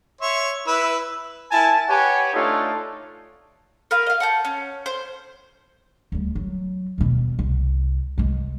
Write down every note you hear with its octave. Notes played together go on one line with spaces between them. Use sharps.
C#5 E5 C6
E4 B4 E6
E4 A#4 G#5 A5
G4 B4 C#5 F#5 G#5
A3 D4 D#4 F4 A4 C#5
A#4 B4 F5
D#5 F5
F#5 A5 G6
C#4
C5
D2 G3
F#3
D#2 B2
C2
C2 G#3